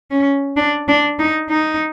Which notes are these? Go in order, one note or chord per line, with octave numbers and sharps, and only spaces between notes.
C#4
D4
D4
D#4
D#4